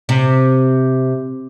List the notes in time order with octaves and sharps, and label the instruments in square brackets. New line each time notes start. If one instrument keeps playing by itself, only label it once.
[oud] C3